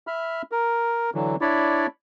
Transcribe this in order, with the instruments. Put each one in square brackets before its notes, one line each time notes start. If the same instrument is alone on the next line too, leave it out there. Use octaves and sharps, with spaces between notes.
[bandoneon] E5 B5 F6
A#4
D3 E3 F#3
D4 E4 C#5 D5 B5